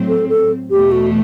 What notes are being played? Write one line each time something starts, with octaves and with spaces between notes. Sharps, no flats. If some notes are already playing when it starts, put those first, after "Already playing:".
Already playing: A2 F#3 C4
A4
A4
E2 B2 A3 G4
F#4